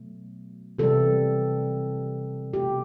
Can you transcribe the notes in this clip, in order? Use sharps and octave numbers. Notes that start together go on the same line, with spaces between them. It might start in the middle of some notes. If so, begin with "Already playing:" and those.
Already playing: B2 F#3 A3
C3 E3 G3 A4
B2 A3 G4